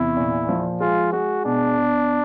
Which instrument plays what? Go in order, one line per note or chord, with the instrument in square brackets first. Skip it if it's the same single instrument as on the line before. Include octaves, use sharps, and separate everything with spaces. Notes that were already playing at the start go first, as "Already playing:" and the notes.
Already playing: [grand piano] E2 C3 [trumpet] E4
[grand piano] A#2
F3
[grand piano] G#3 [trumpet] F4
[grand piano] G#3 [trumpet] F#4
[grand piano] B2 [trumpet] D4
[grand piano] B2